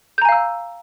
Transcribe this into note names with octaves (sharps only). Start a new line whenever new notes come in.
F5 G#5 A#5 E6 G6